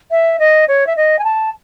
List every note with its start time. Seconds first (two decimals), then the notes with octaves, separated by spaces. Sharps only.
0.10 E5
0.39 D#5
0.67 C#5
0.86 E5
0.96 D#5
1.18 G#5
1.24 A5